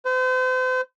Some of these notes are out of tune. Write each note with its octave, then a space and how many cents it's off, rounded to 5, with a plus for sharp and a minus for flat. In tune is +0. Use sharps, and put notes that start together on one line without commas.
C5 -40